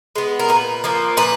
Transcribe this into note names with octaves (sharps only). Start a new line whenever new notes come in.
G#3 B3
A#4
A#2 B4
F3 A#3
A#2 B4